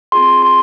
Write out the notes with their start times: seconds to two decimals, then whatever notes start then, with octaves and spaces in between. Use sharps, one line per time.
0.12 C4 F4 G#4 C6
0.42 C6